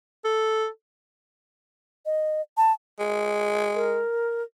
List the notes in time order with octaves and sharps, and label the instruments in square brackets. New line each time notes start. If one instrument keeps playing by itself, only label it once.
[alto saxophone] A4
[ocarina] D#5
A5
[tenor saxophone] G#3
[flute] A#4